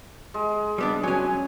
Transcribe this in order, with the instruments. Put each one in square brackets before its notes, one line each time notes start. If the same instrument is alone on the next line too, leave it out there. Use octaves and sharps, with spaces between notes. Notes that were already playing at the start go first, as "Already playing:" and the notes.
[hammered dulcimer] G#3
[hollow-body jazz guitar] G3 B3 D4
[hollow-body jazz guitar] F#3 C#4 [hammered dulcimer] G#5